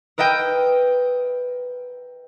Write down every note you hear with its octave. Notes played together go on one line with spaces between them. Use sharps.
A#4 B4 D#5 E5 G5